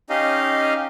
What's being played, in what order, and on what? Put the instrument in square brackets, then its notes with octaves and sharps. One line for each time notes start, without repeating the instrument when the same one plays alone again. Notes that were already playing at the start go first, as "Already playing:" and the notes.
[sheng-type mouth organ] C#4 D#4 G4 D#5 F5